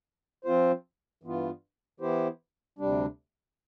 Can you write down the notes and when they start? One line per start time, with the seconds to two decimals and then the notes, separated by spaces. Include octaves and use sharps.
0.44 F3 C4 F4 C5
1.23 G2 E3 B3 F4
2.00 E3 B3 E4 G4 C5
2.79 D2 C3 G3 D4